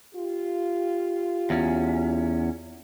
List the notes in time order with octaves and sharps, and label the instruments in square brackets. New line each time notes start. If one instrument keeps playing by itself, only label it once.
[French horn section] F4 G4
[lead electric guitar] E2 C#4